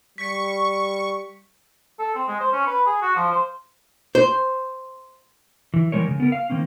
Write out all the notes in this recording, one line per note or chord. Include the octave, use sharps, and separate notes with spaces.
G3 C#6 B6
A4
C4
G#3
C5
C#4
B4
G#4
F#4
F3
C5
C5
E3
E3 G3 G#3 A#4 C#5
C#3
B3 A#4
F5
D#3 A#3 C4 C#4